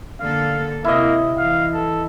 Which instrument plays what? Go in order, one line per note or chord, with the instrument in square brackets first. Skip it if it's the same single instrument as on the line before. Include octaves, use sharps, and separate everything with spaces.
[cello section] D3 A#3 A4 [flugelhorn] F5
[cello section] C3 [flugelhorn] A#3 [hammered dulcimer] E4 D#5
[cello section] E3 [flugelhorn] F5
[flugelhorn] A4